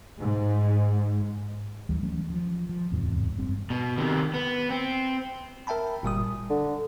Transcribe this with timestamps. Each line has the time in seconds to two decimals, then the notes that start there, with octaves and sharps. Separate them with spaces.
0.20 G#2
1.89 D#2 E3 G3
2.03 E3 F#3 A3 C#4
2.30 F3
2.69 F3
2.91 D1 E2 G#2 C3
3.37 F1 G2 G3 C4
3.70 B2
3.98 C3 D#3
4.34 B3
4.70 C4
5.67 A#4 E5 G5 A5 B5
6.03 G1 A#2 G3 D#6
6.50 D3